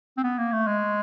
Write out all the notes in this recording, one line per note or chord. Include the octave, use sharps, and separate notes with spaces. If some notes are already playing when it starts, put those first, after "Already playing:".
C4
B3
A#3
A3
G#3